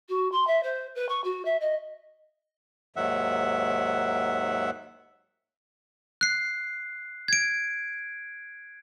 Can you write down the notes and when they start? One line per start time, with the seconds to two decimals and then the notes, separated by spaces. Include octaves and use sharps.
0.09 F#4
0.32 C6
0.47 E5
0.63 C5
0.95 B4
1.09 C#6
1.24 F#4
1.45 E5
1.60 D#5
2.96 D#2 G#2 D#3 F#3 E5 F#5
6.21 F#6 C7
7.28 G#6 D7